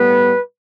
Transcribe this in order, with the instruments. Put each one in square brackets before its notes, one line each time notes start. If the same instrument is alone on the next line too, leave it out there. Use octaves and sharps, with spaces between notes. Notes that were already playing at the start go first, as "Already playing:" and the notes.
Already playing: [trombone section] A2 G3 B3 B4